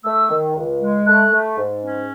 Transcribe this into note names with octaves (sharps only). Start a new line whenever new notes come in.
A3 E6
D#3
C#2
G#3
A3 F#6
A3
G#2
C#4